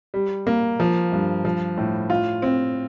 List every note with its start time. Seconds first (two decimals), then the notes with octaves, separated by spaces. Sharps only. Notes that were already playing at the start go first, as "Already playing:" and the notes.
0.14 G3
0.47 A#3
0.80 F3
1.12 G2
1.45 F3
1.78 A2
2.10 F4
2.42 C4